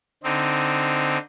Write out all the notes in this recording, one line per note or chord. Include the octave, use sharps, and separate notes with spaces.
D3 C4 D#4